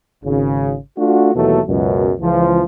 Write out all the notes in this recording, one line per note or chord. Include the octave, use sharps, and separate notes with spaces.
G#1 C#3
A3 D4 F4 F#4
D#2 B2 E3 F#3 A3 A4
C#2 F#2 B2
C#2 E3 F3